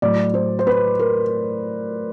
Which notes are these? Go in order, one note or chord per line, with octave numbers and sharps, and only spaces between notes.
A2 F#3 D5
C5
C5
B4
A#4